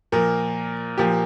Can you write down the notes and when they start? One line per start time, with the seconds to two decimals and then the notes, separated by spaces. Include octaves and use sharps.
0.12 A#2 F3 A#3 A#4
0.98 A#2 F3 A#3 G4